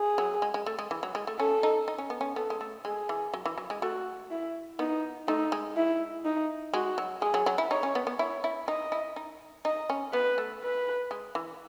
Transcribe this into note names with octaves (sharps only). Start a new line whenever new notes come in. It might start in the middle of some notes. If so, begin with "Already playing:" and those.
Already playing: G#4
F#3
G#3
G#3
A3
G#3
E3
F#3
G#3
A3
C#4 A4
D#4
D#4
C#4
B3
C#4
B3 A4
G#3
A3
G#3 G#4
E3
F#3
E3
F#3
G#3
A3 F#4
E4
B3 D#4
A3 D#4
G#3
E4
D#4
G#3 F#4
F#3
G#3 G#4
F#3
F#3
E4
D#4 C#5
C#4
B3
B3
E4 C#5
E4
D#4 D#5
E4
D#4
D#4 D#5
C#4
B3 B4
A3
B4
G#3
E3